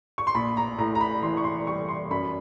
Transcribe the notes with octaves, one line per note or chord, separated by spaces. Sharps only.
C#6
C6
A#1 B5
A#5
A2 A#5
A#5
B5
E3 C6
C#6
C6
G3 C#6
C6
F#2 B5